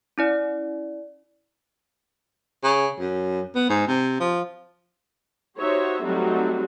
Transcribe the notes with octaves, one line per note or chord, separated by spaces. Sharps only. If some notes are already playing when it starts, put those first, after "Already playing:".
C#4 E4 D5
C#3
F#2
B3
G#2
C3
F3
D#4 F#4 G4 C5 C#5 E5
F#3 G3 A3 C4 D#4 F#4